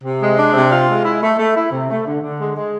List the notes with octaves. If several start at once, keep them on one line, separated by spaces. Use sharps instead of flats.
C3
G#3
D4
C3
F4
G#3
E4
A3
A3
E4
C3
A3
D3
D3
G#3
G#3